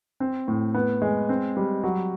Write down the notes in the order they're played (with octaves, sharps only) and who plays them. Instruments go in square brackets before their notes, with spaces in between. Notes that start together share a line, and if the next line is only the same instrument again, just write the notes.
[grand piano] C4
A2
B3
G#3
C4
G3
F#3